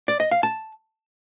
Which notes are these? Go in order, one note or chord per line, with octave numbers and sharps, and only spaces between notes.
D5
D#5
F5
A5